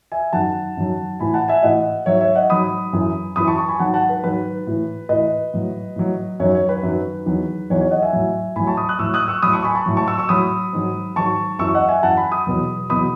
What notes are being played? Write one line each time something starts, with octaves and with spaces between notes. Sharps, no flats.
E5 G#5
F#2 D#3 F#3 F#5 A5
F#2 D#3 F#3
A2 E3 G#5 B5
F#5 A5
E5 G#5
A2 E3 D#5 F#5
G#2 F#3 C#5 E5
C#5 E5
D#5 F#5
G#2 F#3 B5 D#6
F#2 E3
F#2 E3 B5 D#6
A5 C#6
A5 C#6
G#5 B5
G#2 D#3 F#3 F#5 A5
F#5 A5
B4
G#2 D#3 F#3 B4
A2 E3
A2 E3 B4 D#5
A2 F#3
A2 F#3
F#2 D#3 F#3 C#5
C#5
B4
F#2 D#3 F#3
E2 D#3 F#3
E2 D#3 F#3 C#5
C#5
D#5 F#5
E5 G#5
A2 F#3
A2 F#3 G#5 B5
A5 C#6
B5 D#6
D#6 F#6
A2 F#3 C#6 E6
D#6 F#6
C#6 E6
A2 F#3 B5 D#6
A5 C#6
G#5 B5
A5 C#6
A2 F#3
A5 C#6
C#6 E6
C#6 E6
A2 F#3 B5 D#6
G#2 D#3 F#3
G#2 D#3 F#3 A5 C#6
F#2 E3 C#6 E6
D#5 F#5
E5 G#5
F#2 E3 F#5 A5
G#5 B5
B5 D#6
E2 B2 F#3
E2 B2 F#3 B5 D#6